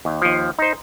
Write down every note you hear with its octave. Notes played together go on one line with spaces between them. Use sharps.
D#2
D#2 F3
D#4 C5